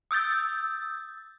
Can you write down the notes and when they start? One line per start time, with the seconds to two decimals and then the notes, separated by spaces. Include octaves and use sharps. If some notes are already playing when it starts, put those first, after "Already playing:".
0.11 D#6 E6 G6 A6